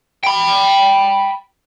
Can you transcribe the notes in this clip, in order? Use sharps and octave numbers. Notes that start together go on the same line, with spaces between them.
G5 B5